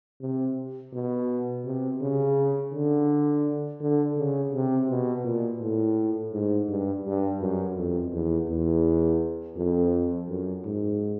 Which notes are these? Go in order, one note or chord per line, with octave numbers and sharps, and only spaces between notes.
C3
B2
C3
C#3
D3
D3
C#3
C3
B2
A#2
A2
G#2
G2
G2
F#2
F2
E2
E2
F2
F#2
G#2